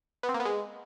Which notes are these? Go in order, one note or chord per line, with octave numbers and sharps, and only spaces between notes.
B3
C4
A#3
B3
G#3